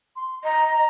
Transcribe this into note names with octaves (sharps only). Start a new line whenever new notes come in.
C6
D#5 A#5
A#5